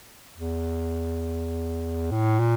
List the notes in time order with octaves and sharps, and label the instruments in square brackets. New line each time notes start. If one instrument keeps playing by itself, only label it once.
[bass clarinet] E2
A2
A#2